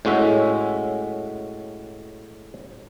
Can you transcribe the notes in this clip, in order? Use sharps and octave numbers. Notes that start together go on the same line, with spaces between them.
A2 G#3 C#4 F#4 E5